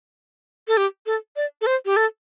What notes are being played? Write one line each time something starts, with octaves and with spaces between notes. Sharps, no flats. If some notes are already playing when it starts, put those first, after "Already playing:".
A4
G4
A4
D5
A4
C5
G4
A4